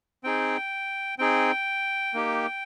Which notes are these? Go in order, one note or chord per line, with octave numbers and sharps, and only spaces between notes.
C4 D#4 G#4 G5
C4 D#4 G#4 G5
A#3 D#4 G4